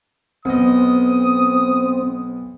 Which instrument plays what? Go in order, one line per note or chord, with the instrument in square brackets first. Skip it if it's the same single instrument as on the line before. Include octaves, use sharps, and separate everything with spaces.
[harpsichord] B1 D#5 [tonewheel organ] C4 [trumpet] D#6